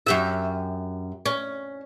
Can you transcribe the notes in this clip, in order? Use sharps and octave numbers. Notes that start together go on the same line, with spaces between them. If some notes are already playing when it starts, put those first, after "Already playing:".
F#2 G4 E5
C#4